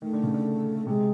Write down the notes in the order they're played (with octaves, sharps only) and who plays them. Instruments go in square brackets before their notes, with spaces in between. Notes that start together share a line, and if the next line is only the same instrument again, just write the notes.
[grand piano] D#3 [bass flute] A3
[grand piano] D3
C#3
D3
[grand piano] C3 [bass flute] G#3